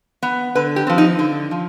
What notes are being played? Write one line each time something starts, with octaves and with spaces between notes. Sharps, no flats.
B3
D3 B4
G4
F3 C4
D#4
D3
F3